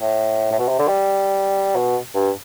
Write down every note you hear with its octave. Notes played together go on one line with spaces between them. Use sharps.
A2
A2
B2
C3
D3
G3
B2
G2